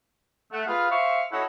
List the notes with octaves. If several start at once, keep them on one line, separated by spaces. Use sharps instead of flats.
A3 F#5
F4 G#4 B4 F5
C5 E5 F5 C#6
E4 F#4 A4 C#5 D#5 F#5